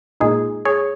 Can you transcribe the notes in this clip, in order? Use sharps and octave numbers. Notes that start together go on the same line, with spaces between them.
A#2 G#3 D#4 G#4
G#4 C#5